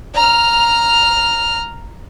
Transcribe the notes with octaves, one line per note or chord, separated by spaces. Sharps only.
A#5 F6